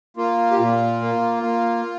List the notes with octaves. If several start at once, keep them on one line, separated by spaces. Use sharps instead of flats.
A#3 F4
G4
A#2 F4
A#3
A#3